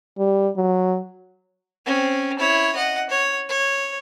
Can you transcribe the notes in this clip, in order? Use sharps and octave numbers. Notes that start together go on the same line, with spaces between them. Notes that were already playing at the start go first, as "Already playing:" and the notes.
G3
F#3
C4 C#4
E4 C#5
D#5 F#5
C#5
C#5